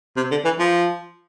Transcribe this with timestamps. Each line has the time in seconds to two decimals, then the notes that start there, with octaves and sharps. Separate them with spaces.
0.16 C3
0.31 D3
0.45 E3
0.59 F3